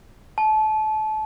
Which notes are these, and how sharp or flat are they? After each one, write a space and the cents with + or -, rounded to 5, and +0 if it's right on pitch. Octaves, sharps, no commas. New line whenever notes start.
A5 -30